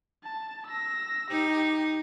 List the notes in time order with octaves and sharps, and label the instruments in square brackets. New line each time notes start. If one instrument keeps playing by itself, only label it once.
[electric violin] A5
E6 A#6
[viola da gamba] D#4 [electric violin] G4